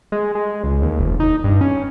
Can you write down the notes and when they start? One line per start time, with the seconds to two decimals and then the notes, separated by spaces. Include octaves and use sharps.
0.12 G#3
0.35 G#3
0.63 C#2
0.82 D#2
0.99 F1
1.20 D#4
1.44 G2
1.61 C#4